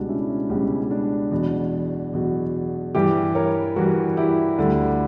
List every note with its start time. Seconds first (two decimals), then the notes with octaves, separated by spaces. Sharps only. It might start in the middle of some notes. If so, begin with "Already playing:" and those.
Already playing: C#2 B2 G3 D4 F#4
0.09 C#4 E4
0.30 C#4
0.50 C#2 B2 G3 C#4
0.91 D4
1.31 E2 B2 F#3
2.13 E2 B2 F#3
2.95 G2 E3 G3 E4 G4
3.35 A#4 C#5
3.76 G2 E3 G3 F#4 A#4
4.17 E4 G4
4.58 D2 D3 G3